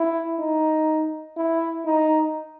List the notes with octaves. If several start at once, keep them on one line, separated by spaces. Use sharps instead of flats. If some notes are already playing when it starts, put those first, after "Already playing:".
Already playing: E4
D#4
E4
D#4